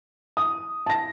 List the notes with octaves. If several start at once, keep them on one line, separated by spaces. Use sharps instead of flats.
D#6
A5 A#6